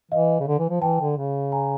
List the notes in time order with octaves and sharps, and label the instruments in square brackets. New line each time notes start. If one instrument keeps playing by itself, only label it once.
[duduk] E3 [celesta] D#5 F5
[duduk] C#3
D3
E3
F3
[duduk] E3 [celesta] G5 A5
[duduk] D3
C#3
[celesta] G#5 A#5